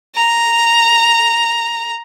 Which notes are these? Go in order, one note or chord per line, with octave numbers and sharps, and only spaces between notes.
A#5